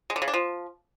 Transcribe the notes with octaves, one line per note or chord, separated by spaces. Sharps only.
G#3
D3
C#3
D4
F3